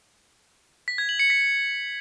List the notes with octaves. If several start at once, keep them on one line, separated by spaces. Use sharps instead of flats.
B6
G#6
F#7
C#7
B6